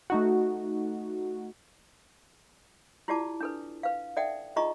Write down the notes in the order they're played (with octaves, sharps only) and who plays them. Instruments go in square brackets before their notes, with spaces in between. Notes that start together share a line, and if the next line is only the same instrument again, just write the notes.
[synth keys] A3 D#4 F#4
[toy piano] E4 F4 G4 D5 A5 D6
D4 A4 B4
B4 F5
D#4 A4 D5 E5 F#5 G5
D#4 F4 G#4 D#5 A#5 C#6